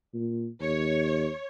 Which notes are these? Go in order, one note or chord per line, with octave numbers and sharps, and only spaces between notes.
A#2
D#2 C#5